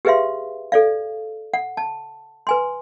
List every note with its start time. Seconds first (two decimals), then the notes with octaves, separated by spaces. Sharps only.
0.05 G4 G#4 B4 E5 F5 C6
0.72 A4 D5 F5
1.54 F#5
1.77 A5
2.47 B4 G#5 C6